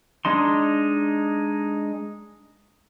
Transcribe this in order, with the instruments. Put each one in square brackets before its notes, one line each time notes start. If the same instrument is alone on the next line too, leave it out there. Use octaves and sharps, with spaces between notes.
[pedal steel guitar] G#3 D4 D#4 C6